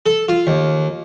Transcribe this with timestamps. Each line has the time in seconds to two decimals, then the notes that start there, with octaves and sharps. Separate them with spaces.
0.06 A4
0.29 F4
0.47 D#2